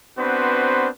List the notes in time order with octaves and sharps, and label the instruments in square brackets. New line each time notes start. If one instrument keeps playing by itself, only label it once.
[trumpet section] B3 C4 D4 F#4 B4 C5